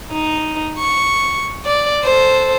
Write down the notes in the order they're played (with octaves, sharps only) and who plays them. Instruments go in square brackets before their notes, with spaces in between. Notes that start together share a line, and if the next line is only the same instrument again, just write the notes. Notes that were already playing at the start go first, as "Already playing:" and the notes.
[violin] D#4
C#6
D5
A4 C5